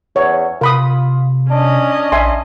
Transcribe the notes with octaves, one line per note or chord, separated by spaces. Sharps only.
E2 C#5
C3 F4 A#4 B5 D#6
C#4 D4 D#5
A#1 E5 G#5 C6